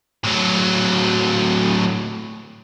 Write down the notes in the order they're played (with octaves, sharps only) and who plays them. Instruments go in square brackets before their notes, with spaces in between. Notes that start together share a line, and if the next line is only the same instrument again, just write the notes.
[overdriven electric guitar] A2 F#3